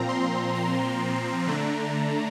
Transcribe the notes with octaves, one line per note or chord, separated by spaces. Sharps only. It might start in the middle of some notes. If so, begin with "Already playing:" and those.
Already playing: A#2 F3 C4 A#5
C6
A#5
D3 A3 D4